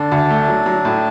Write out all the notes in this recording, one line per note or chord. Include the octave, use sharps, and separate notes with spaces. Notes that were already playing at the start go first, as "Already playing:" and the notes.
Already playing: D3 D4
D2
A3
F#3
F#3
A2